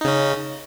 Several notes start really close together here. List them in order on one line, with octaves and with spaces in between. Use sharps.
D#4 C#3 C#4